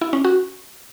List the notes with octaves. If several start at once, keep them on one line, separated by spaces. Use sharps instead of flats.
E4
C#4
F#4